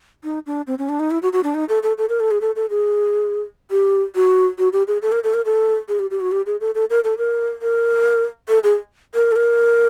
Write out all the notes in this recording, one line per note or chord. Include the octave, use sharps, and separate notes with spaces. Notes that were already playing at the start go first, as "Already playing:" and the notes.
D#4
D4
C4
C#4
D4
D#4
E4
F#4
F#4
D4
D#4
A4
A4
A4
A#4
A4
G#4
A4
A4
G#4
G4
F#4
F#4
G4
G#4
A4
A#4
A4
A#4
A4
G#4
G4
G4
F#4
G4
G#4
A4
A4
A#4
A4
A#4
A#4
A4
G#4
A#4
A4
A#4